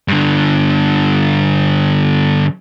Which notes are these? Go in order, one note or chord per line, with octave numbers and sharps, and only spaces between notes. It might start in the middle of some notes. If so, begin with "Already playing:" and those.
G2 D3